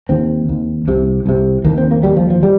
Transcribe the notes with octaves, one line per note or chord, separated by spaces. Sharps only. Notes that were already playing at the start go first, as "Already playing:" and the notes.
D#2 C4
D#2
C2 C3
C2 C3
D#2 A#3
C4
A#3
D#2 G3
F3
F3
G3